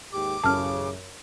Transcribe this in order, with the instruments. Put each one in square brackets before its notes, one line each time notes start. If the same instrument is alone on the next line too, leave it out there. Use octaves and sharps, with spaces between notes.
[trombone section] D#2 G#2 G4 [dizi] D6
[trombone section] A1 C#3 [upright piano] F#2 [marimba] A5 F6